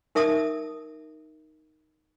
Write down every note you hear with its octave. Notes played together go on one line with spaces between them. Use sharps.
D#4 A#4 E5 A5 D#6